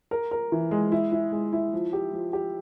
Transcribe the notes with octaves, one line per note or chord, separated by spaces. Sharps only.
A#4
A#4
E3
G#3
E4
E4
G#3
E4
F3
G4
F3
G4